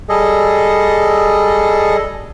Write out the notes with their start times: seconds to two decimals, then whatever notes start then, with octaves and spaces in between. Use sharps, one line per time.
0.09 G3 G#4 A4 D#5